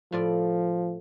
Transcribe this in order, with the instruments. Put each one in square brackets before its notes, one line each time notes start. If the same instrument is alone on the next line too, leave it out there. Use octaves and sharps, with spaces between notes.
[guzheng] A2 F4 D5 [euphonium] F3